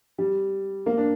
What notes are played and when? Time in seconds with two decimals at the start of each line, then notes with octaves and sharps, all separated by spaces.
0.18 G3
0.86 A#3
0.97 D4